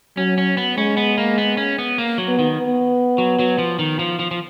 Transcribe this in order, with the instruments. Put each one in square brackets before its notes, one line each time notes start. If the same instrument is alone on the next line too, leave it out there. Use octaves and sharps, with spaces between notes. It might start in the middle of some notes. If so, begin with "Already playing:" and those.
[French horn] F#3 [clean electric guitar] C#4
[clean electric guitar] C#4
B3
[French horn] G#3 [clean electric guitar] C#4
[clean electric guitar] B3
A#3
B3
C#4
B3
A#3
F#3
[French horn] B3
[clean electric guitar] D#3
[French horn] B3
[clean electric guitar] F#3
F#3
F3
D#3
F3
F3
F3